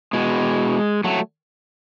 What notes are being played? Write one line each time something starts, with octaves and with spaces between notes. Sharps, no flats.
B2 G#3
F#3 A3